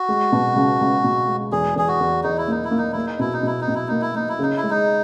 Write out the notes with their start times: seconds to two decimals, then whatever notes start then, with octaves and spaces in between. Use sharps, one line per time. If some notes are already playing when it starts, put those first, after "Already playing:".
Already playing: F#4
0.09 G#3
0.32 B2
0.56 C#2
0.81 C#2
1.04 B2
1.28 G#3
1.52 E2 G#4
1.76 E2 G#4
1.88 F#4
2.00 E2
2.23 E2 D#4
2.38 E4
2.48 A#3 D#4
2.64 E4
2.71 A#3
2.78 D#4
2.92 A#3 E4
3.06 D#4
3.19 B2 E4
3.33 D#4
3.43 B2 E4
3.61 D#4
3.68 B2
3.75 E4
3.88 A#3 D#4
4.01 E4
4.15 A#3 D#4
4.29 E4
4.39 C#3 D#4
4.57 E4
4.63 G#3
4.70 D#4